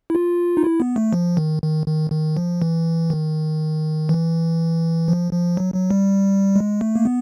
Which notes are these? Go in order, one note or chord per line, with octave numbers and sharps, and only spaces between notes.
E4
F4
D#4
E4
B3
A3
F3
D#3
D#3
D#3
D#3
F3
E3
D#3
E3
F3
F3
F#3
F#3
G3
G#3
A3
A#3
B3